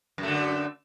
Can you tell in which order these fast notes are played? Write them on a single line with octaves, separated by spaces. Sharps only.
F#2 A3 D3